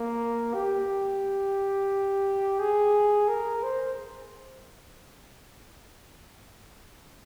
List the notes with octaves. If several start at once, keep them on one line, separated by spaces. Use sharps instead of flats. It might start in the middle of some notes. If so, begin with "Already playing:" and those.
Already playing: A#3
G4
G#4
A#4
C5